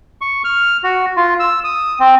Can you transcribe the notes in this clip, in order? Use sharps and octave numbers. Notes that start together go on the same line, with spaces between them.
C#6
F6
F#4
F4
E6
D#6
C4